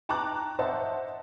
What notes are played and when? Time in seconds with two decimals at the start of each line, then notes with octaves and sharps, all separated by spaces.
0.09 G5 A5 A#5 C#6 D6 F#6
0.59 C5 D#5 E5 F#5 A5